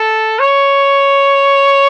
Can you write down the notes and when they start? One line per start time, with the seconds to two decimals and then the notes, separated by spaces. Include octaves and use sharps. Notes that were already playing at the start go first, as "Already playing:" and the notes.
Already playing: A4
0.40 C#5